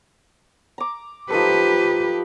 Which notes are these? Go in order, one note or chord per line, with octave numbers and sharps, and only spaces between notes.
A#5 D6
F3 D#4 G4 A4 B4